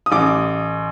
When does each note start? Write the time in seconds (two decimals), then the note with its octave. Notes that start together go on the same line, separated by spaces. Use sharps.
0.06 D#6
0.12 A1 D6